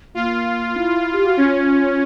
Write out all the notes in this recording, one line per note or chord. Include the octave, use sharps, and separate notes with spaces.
A#3 F4
E4
G4
F#4
C#4 F4